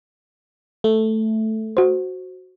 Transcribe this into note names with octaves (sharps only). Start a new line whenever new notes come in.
A3
F#4 C5